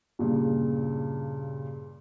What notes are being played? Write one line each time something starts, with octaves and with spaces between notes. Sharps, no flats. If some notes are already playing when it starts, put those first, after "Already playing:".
G2 A#2 C#3